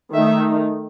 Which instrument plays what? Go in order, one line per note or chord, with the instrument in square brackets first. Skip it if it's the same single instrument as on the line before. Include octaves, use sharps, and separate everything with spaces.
[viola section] D#3 A3 D#4 E5